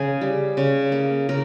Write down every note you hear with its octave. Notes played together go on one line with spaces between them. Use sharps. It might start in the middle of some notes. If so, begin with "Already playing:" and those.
Already playing: C#3 G#4
G3
C#3
A#3
C#3 A#4